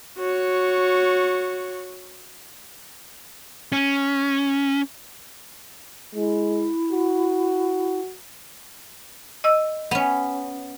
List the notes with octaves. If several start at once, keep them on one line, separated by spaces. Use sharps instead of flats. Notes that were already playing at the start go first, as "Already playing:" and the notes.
F#4 C#5
C#4
G#3 E4
F#4
D#5 E6
B3 C#4